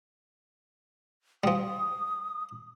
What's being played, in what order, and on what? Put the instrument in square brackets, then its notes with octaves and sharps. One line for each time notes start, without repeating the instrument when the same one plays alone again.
[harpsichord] F3 G3 [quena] D#6